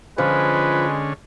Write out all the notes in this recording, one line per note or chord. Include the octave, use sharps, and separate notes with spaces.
D3 F3 G#3 C#4 B4